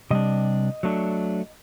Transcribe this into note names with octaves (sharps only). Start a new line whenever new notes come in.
C3 G3 D4 D#5
F#3 A3 D4